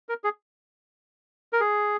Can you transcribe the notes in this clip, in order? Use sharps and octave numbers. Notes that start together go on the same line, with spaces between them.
A#4
G#4
A#4
G#4